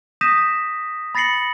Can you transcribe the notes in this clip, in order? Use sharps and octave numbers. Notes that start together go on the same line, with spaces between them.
D#6 G6 A#6 B6 D#7 E7
B5 A6 A#6 C7 C#7 F#7